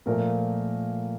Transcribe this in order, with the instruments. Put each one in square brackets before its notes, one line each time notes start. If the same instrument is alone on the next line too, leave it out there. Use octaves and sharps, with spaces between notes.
[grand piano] A#2 F3 A3 A#4